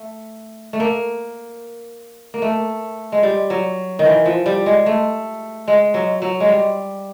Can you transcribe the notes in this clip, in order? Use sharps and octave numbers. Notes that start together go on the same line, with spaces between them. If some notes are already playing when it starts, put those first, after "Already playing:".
Already playing: A3
A3
A#3
A#3
A3
G#3
G3
F#3
D#3
E3
F3
G3
G#3
A3
G#3
F#3
F#3
G#3
G3